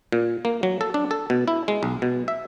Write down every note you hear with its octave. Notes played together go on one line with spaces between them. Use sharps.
A#2
A#3
F#3
A4
D4
A4
B2
E4
G#3
B1
B2
E5